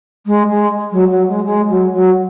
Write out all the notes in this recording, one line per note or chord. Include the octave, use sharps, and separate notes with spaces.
G#3
G#3
F#3
F#3
G#3
G#3
F#3
F#3